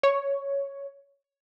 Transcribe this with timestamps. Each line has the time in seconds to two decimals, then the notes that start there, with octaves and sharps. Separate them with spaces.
0.03 C#5